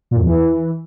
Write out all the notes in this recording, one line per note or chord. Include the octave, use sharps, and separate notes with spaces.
A#2
F#2
E2
E3